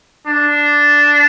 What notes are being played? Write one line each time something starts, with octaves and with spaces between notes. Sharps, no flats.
D4